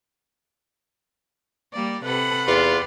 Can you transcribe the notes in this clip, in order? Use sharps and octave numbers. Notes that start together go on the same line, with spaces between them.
G3 A#3 D5
C3 A4 B4 F#5 B5
E2 F4 G4 D5